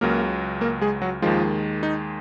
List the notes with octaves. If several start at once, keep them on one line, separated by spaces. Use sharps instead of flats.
C#2 C#3 F#3 A#3 A#4
A#3 A#4
G#3 G#4
F#3 F#4
D#2 D#3 F3 G#3 F4
D#4